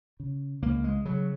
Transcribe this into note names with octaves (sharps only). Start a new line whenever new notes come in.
C#3
C#2 A#3
G#3
C#3 F#3